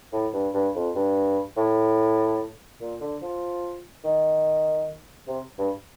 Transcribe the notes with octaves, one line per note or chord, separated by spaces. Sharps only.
A2
G2
G2
F2
G2
A2
A#2
D3
F3
D#3
C3
G2